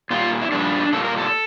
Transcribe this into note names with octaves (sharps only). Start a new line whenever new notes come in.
A#2 G3 A#3 F4
E4
A#2 G3 A#3 D4
A#2 G3 A#3 A4
A#4
A4